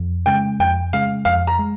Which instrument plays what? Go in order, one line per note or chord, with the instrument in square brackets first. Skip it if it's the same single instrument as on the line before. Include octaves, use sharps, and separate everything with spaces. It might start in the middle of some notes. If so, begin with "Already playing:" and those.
Already playing: [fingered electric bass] F2
[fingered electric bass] C#3 G#3 [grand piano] G5
[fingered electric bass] F2 [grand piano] G5
[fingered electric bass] C#3 G#3 [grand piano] F5
[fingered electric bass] F2 [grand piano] F5
[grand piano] A#5
[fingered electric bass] G#3